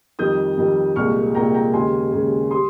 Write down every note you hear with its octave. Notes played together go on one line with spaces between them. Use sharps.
F2 D#3 G3 D#6 G6
F2 D#3 G3
C2 A#2 G#3 C#6 F6
C2 A#2 G#3 G5 A#5
G5 A#5
D#2 C#3 G#3 G#5 C6
D#2 C#3 G#3
G3 C6 D#6